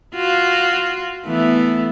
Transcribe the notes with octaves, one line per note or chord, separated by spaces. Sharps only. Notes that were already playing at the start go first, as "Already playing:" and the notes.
F4 F#4
E3 A3 B3